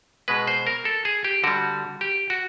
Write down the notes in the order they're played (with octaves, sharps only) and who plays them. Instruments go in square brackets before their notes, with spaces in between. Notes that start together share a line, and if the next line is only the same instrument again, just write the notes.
[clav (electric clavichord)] B2 G#3 B4
C5
A#4
A4
G#4
G4
D3 G3 F#4
G4
F#4